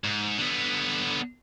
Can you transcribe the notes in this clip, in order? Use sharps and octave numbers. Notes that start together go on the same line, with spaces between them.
G#2
D3 B3